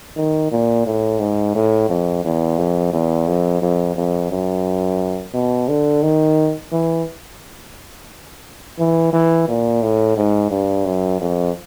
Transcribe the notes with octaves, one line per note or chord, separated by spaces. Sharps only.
D#3
A#2
A2
G#2
A2
F2
E2
F2
E2
F2
F2
F2
F#2
B2
D3
D#3
E3
E3
E3
A#2
A2
G#2
G2
F#2
F2